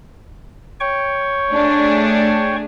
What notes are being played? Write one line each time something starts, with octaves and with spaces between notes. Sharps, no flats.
C#5 G5 C#6
A3 D4 G#4